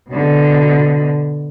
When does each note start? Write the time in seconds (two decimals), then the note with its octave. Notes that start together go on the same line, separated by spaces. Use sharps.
0.11 B2 D3